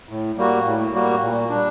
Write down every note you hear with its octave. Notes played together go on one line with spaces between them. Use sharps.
A2
G3 A#3 F#4
A2
G3 A#3 F#4
A#2
G3 D4